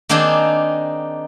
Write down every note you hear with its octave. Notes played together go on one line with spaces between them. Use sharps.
D#3 A#3 C4 D4 D#4 G#4